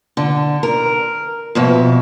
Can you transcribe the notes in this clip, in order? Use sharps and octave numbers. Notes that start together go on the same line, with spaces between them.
D3
A#4
F2 B2 E5